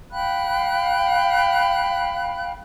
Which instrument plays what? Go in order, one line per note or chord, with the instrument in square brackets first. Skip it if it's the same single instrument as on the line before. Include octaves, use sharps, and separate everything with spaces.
[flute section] F5 G5 B5 F#6